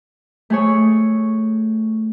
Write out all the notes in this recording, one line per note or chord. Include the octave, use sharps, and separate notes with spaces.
A3 G#4 C#5